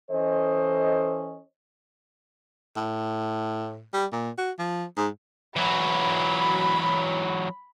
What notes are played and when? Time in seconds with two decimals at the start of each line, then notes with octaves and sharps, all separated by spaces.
0.11 E3 C#4 A4 C5 D#5
2.77 A2
3.94 G3
4.13 A#2
4.38 F#4
4.59 F3
4.97 G#2
5.56 E3 F#3 B5